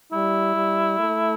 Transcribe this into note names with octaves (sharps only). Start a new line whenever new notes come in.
G3 E4
G3
A3